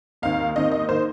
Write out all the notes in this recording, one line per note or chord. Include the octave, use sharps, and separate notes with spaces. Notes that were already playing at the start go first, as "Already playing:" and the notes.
D#2 D#3 C4 D#4 F5
D#2 D#3 C4 D#4 D#5
D#5
D#3 A#3 C5